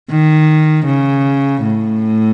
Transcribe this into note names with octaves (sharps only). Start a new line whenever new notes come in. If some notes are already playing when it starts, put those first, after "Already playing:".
D#3
C#3
A2